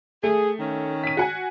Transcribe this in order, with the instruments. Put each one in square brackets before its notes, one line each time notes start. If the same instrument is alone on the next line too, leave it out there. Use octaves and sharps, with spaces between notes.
[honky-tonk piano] A3 [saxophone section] G#4
[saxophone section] D#3 C#4
[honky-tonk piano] B6 D#7
F#4 F#5 G#5